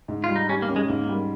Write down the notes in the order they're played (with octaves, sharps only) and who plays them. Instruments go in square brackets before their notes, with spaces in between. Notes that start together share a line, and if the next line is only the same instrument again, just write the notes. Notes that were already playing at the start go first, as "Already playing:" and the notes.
[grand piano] G#2
[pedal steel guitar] F4
[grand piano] G3
[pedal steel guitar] D#4
[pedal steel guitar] C#4 [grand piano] G4
[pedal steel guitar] A#3
[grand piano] C#4
[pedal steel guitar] G#3
[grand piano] G#2 [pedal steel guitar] A#3
[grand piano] G3